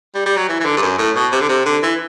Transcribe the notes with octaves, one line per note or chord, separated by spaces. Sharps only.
G3
G3
F#3
E3
E3
D3
G2
F#2
A2
B2
C3
D3
C3
D3
E3